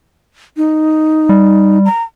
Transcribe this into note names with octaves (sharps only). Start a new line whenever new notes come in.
D#4
G3
A#5